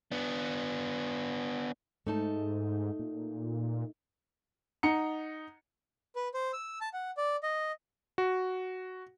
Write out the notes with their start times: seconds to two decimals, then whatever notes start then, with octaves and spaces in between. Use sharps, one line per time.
0.12 B3 D4
2.07 G#2 A3 D#4 A5
2.99 A#2
4.83 D#4 F#5 A#5 C#7
6.16 B4
6.34 C5
6.53 E6
6.81 A5
6.93 F#5
7.17 D5
7.43 D#5
8.18 F#4